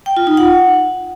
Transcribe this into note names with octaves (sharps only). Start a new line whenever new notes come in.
G5
F4
D#4
F#5